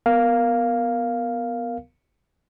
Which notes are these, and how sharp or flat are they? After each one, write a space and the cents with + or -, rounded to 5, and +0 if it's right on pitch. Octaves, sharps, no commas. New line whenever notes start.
B3 +0 A#4 +0 F5 +0